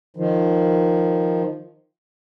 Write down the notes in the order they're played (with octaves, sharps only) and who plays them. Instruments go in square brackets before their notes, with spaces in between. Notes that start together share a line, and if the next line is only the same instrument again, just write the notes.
[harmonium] D#3 F3